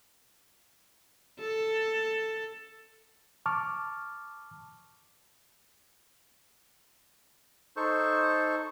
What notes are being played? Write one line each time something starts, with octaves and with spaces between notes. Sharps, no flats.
A4
A5 C#6 D6 F6
D#4 A4 C5 C#6